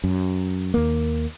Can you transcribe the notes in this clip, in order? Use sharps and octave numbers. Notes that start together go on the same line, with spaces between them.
F#2
D#2 A#3